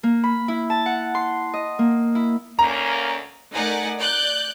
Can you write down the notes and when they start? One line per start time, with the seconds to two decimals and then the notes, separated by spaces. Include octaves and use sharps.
0.03 A#3
0.24 B5
0.48 E4
0.70 A5
0.86 F#5
1.15 C6
1.54 D#5
1.79 A#3
2.15 E4
2.59 D2 A#3 C#4 A#5
3.54 A3 D#4 A#4 D5 F#5 G#5
3.99 D5 F#6 G6